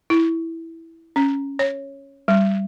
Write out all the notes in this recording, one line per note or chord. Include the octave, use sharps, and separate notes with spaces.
E4
C#4
C#5
G3